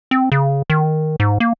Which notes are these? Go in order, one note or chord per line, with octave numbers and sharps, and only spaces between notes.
C4
C#3
D#3
G#2
A#3